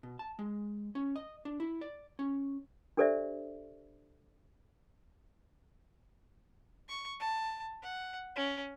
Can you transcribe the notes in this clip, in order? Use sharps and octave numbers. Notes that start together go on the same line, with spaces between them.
B2
A5
G#3
C#4
D#5
D4
E4
D5
C#4
D4 G4 A4 C5 D5 E5
C#6
A5
F#5
C#4